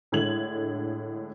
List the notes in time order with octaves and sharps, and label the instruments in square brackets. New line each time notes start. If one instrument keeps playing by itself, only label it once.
[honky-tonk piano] A2 D3 G#3 G#6 F#7